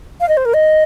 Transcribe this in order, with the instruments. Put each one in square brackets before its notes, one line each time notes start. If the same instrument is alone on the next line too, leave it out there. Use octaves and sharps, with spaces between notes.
[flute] F5
D#5
C5
A#4
D#5